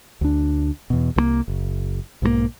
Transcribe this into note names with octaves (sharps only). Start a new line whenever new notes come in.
D2 D4
E2 B2
C2 F#3 A#3
F#1
B1 G#2 F#3 A#3